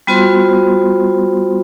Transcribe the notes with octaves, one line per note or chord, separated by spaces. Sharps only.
G3 B3 F4 F#4 C5 C6